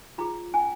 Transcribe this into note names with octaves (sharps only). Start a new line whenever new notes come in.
F4 G#4 A#5
C#4 G#5